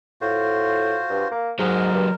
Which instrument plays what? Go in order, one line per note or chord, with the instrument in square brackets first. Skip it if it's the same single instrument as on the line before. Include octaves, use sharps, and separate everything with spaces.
[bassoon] A2 [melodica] F4 F#4 C5
[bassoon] G2
A#3
[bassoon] G#2 [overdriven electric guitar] F#3 G#3 [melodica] A#4
[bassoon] G2